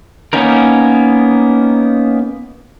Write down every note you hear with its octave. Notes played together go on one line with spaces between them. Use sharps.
A#3 B3 C#4 D#4 A#4